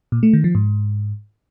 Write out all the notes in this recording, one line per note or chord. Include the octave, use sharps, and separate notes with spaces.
A#2
A3
D#3
F3
G#2